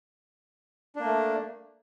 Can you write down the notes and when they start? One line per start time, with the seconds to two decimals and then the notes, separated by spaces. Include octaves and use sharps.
0.96 D4
1.00 A#3
1.05 A3